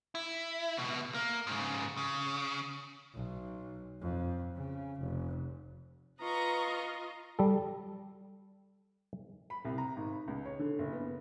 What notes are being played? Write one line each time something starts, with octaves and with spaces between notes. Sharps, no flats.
E4
C#2 B2
A#3
G#2 C#3
C#3
B1
F2
C#3
F1
F4 B4 D#5 A#5 C#6
G3 A4
B5
C2
A#5
G#1
B5
C#2
C#5
D3
F#1
B3